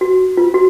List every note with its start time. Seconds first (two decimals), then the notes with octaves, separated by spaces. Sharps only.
0.01 F#4
0.37 F4
0.54 F#4